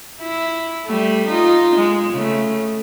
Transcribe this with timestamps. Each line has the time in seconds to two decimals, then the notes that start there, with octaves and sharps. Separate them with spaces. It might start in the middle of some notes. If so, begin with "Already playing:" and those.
0.21 E4
0.85 G3 A3
1.27 D#4 F4
1.75 G#3
2.12 C#3 A3